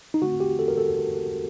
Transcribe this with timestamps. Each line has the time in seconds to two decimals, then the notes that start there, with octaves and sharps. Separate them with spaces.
0.14 D#4
0.22 D3 A3 C4 F#4
0.40 G4
0.59 A4
0.68 A#4
0.78 A4